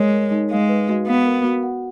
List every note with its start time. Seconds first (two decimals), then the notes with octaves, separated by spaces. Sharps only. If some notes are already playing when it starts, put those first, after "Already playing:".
Already playing: G#3 A#4 C#5
0.13 A#4
0.31 D#4
0.51 G#3 F5
0.69 B4
0.88 F#4
1.07 B3 F5
1.25 A#4
1.44 F#4
1.63 F#5